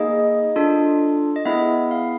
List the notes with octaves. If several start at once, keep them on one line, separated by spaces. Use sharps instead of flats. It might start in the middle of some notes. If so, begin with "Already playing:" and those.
Already playing: A#3 D#4 G#4 D#5
D4 F4 A4
D#5
B3 E4 G#4 E5
F5